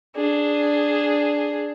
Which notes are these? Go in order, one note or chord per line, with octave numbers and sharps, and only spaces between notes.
D4 G#4